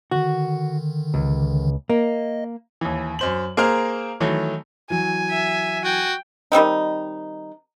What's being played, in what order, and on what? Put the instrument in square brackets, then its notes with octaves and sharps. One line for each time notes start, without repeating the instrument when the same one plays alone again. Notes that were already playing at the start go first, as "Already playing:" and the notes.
[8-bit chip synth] D3 D#3 [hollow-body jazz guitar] F#4
[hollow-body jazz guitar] C#2
[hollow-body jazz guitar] A#3 [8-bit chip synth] D#5
[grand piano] D#2 E3
F#2 C5 F#7
A#3 G#4 A#4 C5 F6
D#3 E3 F#3 A3
[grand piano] E3 F#3 [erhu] G#5
[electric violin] E5
[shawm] F#4 [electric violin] G5
[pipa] D#3 G3 C4 D#4